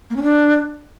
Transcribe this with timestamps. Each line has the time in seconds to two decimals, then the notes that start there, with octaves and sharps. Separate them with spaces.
0.10 A#3
0.16 C#4
0.23 D4